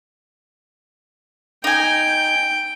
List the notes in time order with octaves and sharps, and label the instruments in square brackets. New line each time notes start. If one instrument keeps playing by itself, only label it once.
[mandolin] D#4 G#5 [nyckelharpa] G5